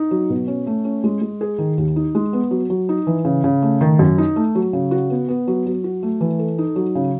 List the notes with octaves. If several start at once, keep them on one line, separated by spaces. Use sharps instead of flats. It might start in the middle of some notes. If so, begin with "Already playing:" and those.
Already playing: D#4
F#3
B2
C#4
A3
C#4
G#3
G#3
G#4
D#3
D#2
D#4
G#3
B3
F#3
F#3
D#4
E3
C#3
C#3
A3
D#3
F#2
D#4
A3
F#3
C#3
F#4
B3
B3
F#3
F#3
F#4
A3
E3
A4
D#4
F#3
C#3